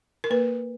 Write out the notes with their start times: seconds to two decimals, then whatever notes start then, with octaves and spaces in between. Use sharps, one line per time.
0.24 A#4
0.30 A#3 B4